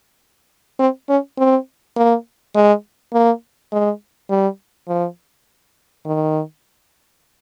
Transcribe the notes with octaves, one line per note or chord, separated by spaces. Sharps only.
C4
C#4
C4
A#3
G#3
A#3
G#3
G3
F3
D#3